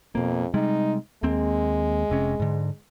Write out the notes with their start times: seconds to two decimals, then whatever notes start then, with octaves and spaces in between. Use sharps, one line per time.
0.15 F2 B2 A#3
0.54 C3 G3 G#3 D#4
1.23 D#2 G#3 A#3 C4
2.10 F1 C3 C#4
2.40 G#2 D3